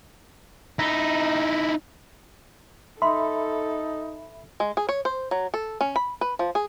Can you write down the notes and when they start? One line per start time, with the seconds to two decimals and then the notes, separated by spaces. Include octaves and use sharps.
0.79 D#4 E4
3.02 D#4 A4 E5 B5 C6
4.60 G#3
4.77 G#4
4.89 C#5
5.05 C5
5.31 F#3
5.54 A4
5.81 C#4
5.96 B5
6.21 B4
6.39 F3
6.55 G#4